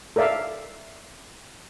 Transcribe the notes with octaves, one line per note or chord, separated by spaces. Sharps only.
A4 A#4 D5 E5 F5